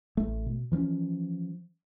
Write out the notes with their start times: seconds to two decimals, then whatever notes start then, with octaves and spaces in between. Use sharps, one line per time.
0.17 A1 A3
0.46 B2
0.72 E3 F3 C4 C#4